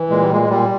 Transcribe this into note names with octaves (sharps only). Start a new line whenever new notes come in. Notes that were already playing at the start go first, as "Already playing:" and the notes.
Already playing: E3
A#2 G#3
G3
A#2 G#3
G#3
A#2 G3